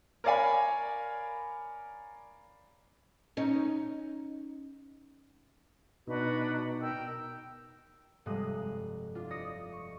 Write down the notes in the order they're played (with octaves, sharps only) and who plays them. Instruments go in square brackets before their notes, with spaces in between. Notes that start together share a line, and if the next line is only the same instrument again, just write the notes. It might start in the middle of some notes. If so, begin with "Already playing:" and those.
[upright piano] A#4 C#5 D5 F5 G#5 B5
[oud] C#4 D#4
[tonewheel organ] B2 D#4 [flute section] D4 F#4 B4
[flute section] A#4 G5 E6
[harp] F1 G2 C3 G#3 D#6 F#6
D4 F4
D5 D#5 D#6 A#6 C#7
C#6